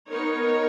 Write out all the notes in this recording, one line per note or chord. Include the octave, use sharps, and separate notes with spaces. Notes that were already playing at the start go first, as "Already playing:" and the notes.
B3 D#4 A#4 C#5